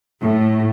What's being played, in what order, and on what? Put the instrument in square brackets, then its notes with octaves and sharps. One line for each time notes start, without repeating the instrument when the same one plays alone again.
[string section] A2